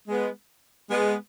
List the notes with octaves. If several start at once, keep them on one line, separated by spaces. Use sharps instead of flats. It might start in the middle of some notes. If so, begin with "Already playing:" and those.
G#3 B3
G#3 B3